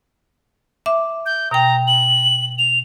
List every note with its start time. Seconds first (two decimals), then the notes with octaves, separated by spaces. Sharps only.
0.86 E5 D6
1.26 G6
1.51 B2 G5 A#5
1.87 F#7
2.58 F7